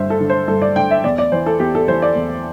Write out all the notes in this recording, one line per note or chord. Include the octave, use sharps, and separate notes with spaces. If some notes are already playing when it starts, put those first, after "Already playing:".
Already playing: G2 D3 C5 E5
A4
D3
C5
G2 A4
D5
D3 G5
E5
E2 D5
D5
E3 C5
A4
E2 G4
A4
E3 C5
D5
E2